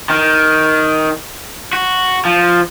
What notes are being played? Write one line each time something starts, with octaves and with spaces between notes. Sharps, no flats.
D#3
F#4
F3